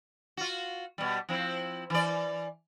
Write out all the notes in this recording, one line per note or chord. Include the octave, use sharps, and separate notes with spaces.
F4 F#4
B2 G3
F3 C4 E4
E3 D5